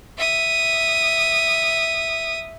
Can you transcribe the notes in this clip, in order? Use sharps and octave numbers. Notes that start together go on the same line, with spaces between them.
E5 D#6